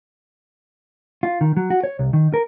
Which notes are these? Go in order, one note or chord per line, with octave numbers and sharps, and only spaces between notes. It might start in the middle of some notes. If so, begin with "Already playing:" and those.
F4
D#3
F#3
F#4
C#5
C2
D#3
A#4